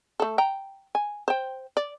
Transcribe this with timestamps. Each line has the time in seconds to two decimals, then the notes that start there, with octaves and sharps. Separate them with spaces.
0.20 A3 A4
0.38 G5 A#5
0.95 G#5
1.28 C5 G5
1.77 D5